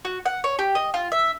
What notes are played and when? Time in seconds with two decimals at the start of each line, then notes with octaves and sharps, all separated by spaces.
0.05 F#4
0.26 F#5
0.44 C#5
0.59 G4
0.75 D#5
0.94 F4
1.12 E5